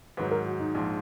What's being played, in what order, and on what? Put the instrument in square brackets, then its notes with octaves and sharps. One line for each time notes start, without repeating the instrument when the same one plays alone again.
[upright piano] G#2 D#3 F#3 [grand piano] B4
[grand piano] A#4
F#4
D#4
[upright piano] A#1 G#2 F3